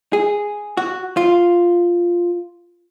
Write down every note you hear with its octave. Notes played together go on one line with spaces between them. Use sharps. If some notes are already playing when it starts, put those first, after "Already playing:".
G#4
F#4
F4